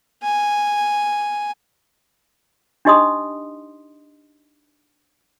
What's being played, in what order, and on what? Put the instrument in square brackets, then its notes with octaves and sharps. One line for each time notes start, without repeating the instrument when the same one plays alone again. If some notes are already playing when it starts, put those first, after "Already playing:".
[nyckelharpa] G#5
[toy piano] D4 D#4 G4 D#5 C6 D#6